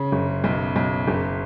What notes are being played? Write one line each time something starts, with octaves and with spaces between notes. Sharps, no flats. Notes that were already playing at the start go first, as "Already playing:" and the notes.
Already playing: C#3
F#1
B1
B1
F#1